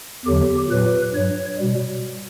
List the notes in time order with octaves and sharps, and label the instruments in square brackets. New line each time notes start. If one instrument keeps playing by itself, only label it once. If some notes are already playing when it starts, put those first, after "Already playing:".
[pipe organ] E2 D3 F#3 G4
A#2 F#3 B4
G2 F#3 C#5
B2 G3